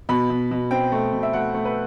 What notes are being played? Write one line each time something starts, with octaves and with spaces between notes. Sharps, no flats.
B2 B5
B2
B2
C4 G5
A3
B2
E5
A3 F#5
A3
B4